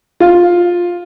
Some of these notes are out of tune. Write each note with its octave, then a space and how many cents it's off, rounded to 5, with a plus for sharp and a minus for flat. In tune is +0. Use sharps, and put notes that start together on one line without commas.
F4 +10